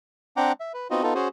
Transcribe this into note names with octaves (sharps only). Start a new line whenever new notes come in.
C4 D4 F#5 G5 A#5 D6
E5
B4
B3 C4 D#4 F4 F#4 D#5
B3 D#4 F4 A4
C#4 F#4 G#4 C5